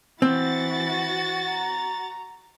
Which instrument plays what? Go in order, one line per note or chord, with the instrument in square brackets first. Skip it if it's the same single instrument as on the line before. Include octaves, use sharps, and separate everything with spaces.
[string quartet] E3 [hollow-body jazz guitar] C4 [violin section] F#4 A6
[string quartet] A#5